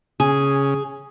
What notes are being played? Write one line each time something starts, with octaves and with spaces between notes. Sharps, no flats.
C#3 G#4